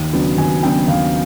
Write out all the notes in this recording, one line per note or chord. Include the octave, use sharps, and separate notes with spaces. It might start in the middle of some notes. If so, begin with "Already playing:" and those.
Already playing: D#2
C#3 F#3 B3 D4
D#2 G#5
C#3 F#3 B3 D4 G5
D#2 F5